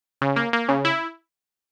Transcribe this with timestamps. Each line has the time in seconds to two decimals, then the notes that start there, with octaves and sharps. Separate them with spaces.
0.22 C#3
0.36 A#3
0.53 A#3
0.69 C#3
0.85 E4